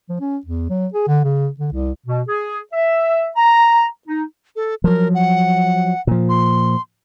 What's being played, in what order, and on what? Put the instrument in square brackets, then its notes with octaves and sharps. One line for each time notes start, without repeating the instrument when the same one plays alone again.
[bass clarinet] F3
C#4
E2
F#3
G#4
D3
C#3
D3
C2
[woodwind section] B2
G#4
E5
A#5
D#4
[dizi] A4
[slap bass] F3 F#3 [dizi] A#4
[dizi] F#5
[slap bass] A#2 F3
[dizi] C6